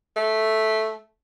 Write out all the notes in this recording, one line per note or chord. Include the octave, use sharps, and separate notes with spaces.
A3